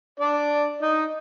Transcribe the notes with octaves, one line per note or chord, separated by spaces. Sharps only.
D4 D5
D#4 D#5